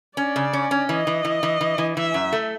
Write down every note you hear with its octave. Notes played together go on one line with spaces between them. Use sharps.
C#4 D5
C#3
C#4
C#4
E3 D#5
E3
E3
E3
E3
E3
E3 E5
F#2
A3